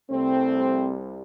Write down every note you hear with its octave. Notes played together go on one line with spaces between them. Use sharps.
C2 C3 G3 A3 C4